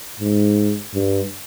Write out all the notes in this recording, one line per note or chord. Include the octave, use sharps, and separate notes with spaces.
G#2
G2